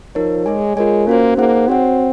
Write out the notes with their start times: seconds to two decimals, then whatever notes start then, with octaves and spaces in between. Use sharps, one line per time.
0.15 F3 D#4 A#4 C#5
0.46 G#3 G#4 C#5 G#5
0.76 G#3 F4 A#4 C#5 G#5
1.07 A#3 C#4 F#4 C5
1.37 A#3 D#4 G#4 C5 F#5
1.68 C4 F#4 C#5 F#5